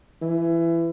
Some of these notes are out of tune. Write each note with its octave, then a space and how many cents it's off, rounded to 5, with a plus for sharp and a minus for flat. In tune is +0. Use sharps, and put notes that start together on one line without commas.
E3 +25